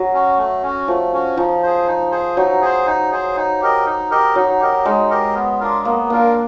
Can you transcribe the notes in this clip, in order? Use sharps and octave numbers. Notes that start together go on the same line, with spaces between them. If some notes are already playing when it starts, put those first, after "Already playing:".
Already playing: F#3
C#4 F#4
A3
C#4 F#4
F3 A3
C#4 F#4
F3 D#4
G#4 C5
D#4
G#4 C5
F#3 D#4
G#4 C5
D#4
G#4 C5
D#4
G4 A#4 D#5
D#4
G4 A#4 D#5
F#3 D#4
G4 A#4 D#5
G#3 D#4
G4 A#4 D#5
B3
D4 F4 A#4
A#3 B3
A#3 D4 F4 A#4